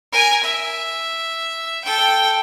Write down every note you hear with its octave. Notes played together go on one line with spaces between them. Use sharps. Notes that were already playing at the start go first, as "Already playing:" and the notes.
A#4 G#5
E5
A4 G5